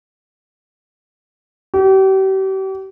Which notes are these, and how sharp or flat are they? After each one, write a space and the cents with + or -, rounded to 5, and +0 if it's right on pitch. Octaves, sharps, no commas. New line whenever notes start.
G4 -40